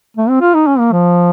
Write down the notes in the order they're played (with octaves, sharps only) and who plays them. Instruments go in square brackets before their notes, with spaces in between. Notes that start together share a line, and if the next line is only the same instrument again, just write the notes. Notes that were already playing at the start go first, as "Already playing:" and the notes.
[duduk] A3
C4
F4
D#4
C#4
A#3
F3